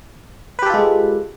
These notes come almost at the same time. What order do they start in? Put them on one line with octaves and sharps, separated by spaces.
B4 G4 A4 F4 G#3